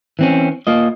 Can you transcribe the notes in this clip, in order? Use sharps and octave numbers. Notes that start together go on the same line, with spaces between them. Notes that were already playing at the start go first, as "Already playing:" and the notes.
E3 C4 C#4
A#3 F4 D#5